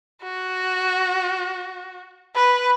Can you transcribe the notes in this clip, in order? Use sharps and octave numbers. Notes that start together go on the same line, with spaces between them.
F#4
B4